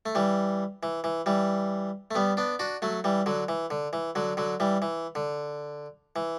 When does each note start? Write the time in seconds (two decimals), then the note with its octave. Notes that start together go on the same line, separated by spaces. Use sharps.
0.06 A3
0.15 E3 G3
0.83 E3
1.04 E3
1.26 E3 G3
2.11 A3
2.15 G3 B3
2.37 B3 D4
2.59 D4 F#4
2.82 F#3 A3
3.04 E3 G3
3.26 D3 F#3
3.48 E3
3.70 D3
3.93 E3
4.15 D3 F#3
4.37 D3 F#3
4.60 E3 G3
4.82 E3
5.15 D3
6.16 E3